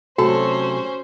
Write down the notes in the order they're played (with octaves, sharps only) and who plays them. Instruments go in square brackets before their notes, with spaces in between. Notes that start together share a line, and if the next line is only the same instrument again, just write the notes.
[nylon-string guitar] C3 F#3 A3 [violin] C#4 C5 [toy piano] F#4 [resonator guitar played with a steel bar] A4